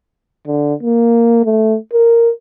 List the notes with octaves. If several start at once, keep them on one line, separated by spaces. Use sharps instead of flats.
D3
A#3
A3
A#4